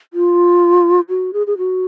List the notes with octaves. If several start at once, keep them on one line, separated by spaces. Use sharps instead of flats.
F4
F#4
G#4
G#4
F#4